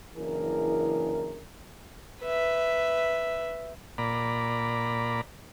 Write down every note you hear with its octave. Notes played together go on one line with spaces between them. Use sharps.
F#1 E3 D4 E4 G#4 A#4
B4 E5
A#2 D5 A#5 B5